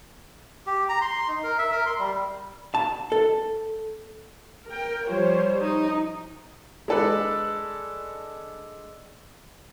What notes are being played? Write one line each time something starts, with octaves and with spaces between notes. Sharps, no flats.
G4
A#5
C6
D#4
A#4
E5
A#4
C6
G3
A5
A4
A#4 G5
F3 G3 C5 C#5
D#4
G#3 D4 A4 B4 D5